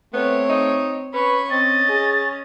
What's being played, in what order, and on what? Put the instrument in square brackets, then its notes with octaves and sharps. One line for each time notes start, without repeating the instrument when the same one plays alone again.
[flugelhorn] A3 [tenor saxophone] B3 [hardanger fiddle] C4 C#5
[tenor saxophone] D#4
[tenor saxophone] C#4 [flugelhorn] B4 [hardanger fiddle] B5 C#6
[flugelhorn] C4 [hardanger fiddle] D#5 [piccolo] A6
[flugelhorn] G#4